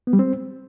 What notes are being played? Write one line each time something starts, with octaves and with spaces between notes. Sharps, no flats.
B3
G3
C4